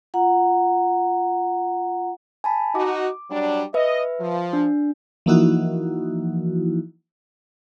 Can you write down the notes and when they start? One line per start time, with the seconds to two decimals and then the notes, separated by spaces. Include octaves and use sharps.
0.14 F4 F#5 A#5
2.44 G#5 A5 B5
2.75 D#4 F#4 D6
3.31 F#3 G3 D4
3.74 B4 D#5 E5
4.20 F3
4.53 D4
5.26 E3 F3 A#3 D#4 E4 F#4